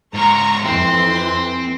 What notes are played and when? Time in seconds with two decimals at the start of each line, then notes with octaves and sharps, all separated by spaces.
0.14 G#2 F4 A#5 C#6
0.64 F2 E3 C4 C6